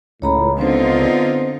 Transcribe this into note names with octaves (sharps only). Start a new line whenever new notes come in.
C#2 A2 C#5 A#5 B5
D3 B3 C4 D#4 F4 C5